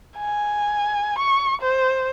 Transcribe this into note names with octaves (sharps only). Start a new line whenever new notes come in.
G#5
C#6
C5